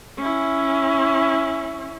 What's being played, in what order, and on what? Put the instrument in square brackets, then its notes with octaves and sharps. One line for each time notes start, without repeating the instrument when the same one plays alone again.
[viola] C#4 E4